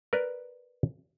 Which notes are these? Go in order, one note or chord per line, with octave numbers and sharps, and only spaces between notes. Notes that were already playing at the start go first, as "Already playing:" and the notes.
A#4 B4 D5